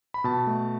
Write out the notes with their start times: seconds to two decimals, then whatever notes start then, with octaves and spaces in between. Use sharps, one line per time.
0.14 B5
0.24 B2 A5
0.47 A3